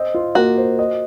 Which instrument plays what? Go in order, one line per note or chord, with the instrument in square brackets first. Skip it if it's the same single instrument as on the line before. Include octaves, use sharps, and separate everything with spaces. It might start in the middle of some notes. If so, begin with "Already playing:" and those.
Already playing: [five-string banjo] C4 [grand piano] D#5
[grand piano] F4
[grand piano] A#3 [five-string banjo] F#4
[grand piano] C5
D#5